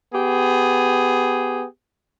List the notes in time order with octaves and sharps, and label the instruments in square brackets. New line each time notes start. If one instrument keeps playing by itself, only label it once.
[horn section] B3 G4 G#4